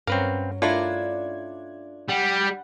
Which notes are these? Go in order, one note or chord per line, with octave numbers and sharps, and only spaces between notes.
G2 F#3 C4 C#4 A#4 B4 C#5 F5
A3 D4 E4 F4 A#4 D5 G#6
G3 F#5